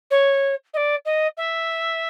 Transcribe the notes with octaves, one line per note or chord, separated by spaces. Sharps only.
C#5
D#5
D5
D#5
E5